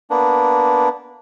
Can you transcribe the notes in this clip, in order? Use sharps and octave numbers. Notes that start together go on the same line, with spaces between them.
A#3 B3 D4